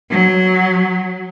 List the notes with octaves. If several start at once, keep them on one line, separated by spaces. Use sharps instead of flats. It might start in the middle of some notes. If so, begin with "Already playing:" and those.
F#3